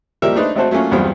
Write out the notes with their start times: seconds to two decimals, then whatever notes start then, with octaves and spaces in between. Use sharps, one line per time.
0.22 D#2 F3 G3 G4 A#4 E5
0.35 A3 D4 D#4 B4 C5
0.55 G#1 A3 C4 F#4 A4 C5
0.71 F#3 A3 A#3 C#4 F4
0.91 B1 E2 G2 G3 C4 F4